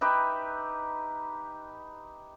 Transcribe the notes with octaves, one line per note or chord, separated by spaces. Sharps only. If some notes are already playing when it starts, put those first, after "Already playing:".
D#4 G4 B4 E5